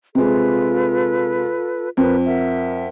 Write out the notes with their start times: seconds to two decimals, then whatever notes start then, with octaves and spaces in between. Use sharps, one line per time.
0.15 C3 G#3 F4 A4 B4
1.97 F2 A#4 B4
2.26 A#4 E5 F#5